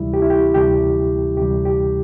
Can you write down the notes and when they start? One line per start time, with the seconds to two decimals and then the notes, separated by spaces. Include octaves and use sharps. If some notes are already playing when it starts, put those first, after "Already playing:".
Already playing: D2 C3 E3 G3 E4
0.14 G4
0.22 E4
0.30 G4
0.54 D2 C3 E3 G3 G4
1.37 D2 C3 E3 G3 G4
1.65 G4